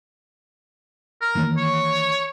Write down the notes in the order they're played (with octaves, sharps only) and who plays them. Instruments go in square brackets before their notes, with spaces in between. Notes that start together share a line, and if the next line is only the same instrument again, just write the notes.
[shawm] A#4
[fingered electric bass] D#3 E3 A#3
[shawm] C#5